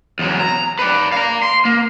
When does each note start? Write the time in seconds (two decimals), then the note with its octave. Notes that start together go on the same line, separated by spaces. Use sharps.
0.19 E2 F#3
0.40 A#5
0.79 B4 D5
1.12 F5 A#5
1.43 C6
1.65 A#3